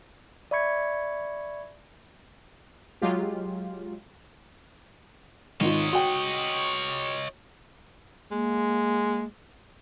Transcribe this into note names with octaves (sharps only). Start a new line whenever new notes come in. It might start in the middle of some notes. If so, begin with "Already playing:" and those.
D5 E5 B5 C#6 G#6 C#7
F#3 G#3 F4 G4
G#1 D#3 F4 C#5 D#5
F#4 G5
G#3 A#3